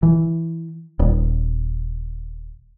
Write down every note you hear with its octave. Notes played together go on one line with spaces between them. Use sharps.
E3
D#1